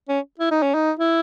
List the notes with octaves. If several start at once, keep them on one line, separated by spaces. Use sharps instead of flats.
C#4
E4
D#4
C#4
D#4
E4